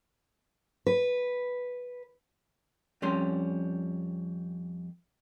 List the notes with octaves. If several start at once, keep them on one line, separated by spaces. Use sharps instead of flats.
B4
F2 G3 C#4 C6